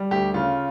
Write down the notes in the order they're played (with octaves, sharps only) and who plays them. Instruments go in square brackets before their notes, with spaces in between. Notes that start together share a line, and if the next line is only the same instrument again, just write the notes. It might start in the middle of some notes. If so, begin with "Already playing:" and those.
Already playing: [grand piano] G3
D2 G4
C#3 F4